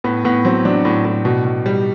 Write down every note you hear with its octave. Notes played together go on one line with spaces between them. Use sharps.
A2 B3
A2 B3
F#3 C4
F#3 D4
A2
A2
B2
B2
G3